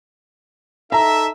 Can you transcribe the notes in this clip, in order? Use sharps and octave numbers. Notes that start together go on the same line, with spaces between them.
D#4 A4 E5 A#5